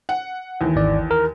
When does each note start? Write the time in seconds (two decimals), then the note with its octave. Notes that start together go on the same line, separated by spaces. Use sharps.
0.09 F#5
0.61 D#2 E3
0.76 G#1 D5
1.11 A#4